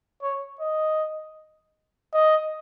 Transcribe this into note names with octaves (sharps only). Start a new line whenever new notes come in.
C#5
D#5
D#5